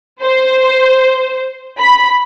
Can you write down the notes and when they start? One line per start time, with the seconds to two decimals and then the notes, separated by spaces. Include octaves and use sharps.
0.22 C5
1.80 B5